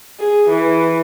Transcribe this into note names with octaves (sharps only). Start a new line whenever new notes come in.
G#4
E3